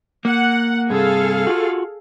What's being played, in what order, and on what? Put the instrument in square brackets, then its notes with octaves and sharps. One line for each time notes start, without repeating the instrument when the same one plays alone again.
[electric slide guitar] A#3 [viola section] F#5
[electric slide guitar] G2 C3 [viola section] G#4 A4 F5
[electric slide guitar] F4 F#4